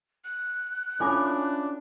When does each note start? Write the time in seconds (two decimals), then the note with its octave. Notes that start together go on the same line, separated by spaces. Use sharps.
0.24 F#6
1.00 C#4 D4 E4 F4 A4 G#5 D6